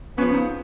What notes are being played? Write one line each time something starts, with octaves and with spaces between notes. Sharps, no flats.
C#3 F3 B3 C#4
D#4